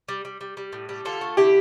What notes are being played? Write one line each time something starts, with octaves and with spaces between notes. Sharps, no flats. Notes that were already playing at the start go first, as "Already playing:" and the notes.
G3
G3
G3
G3
A2
G3
D3 F4 A4
A3
D3 E4 G4